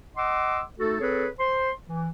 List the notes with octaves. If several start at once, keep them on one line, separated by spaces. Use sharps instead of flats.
D#5 F#5 C6 D6 E6
A3 D#4 F#4 A4
C4 G#4 A4 B4 C#5
C5 C6
E3